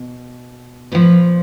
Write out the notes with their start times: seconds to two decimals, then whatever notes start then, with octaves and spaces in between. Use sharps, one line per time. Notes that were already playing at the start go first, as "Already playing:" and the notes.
Already playing: B2
0.92 A#2 F3 B4